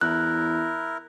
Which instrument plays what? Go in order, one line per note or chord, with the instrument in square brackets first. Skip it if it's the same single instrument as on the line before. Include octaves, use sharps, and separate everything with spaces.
[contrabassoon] E2 [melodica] E4 A#4 [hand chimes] F#6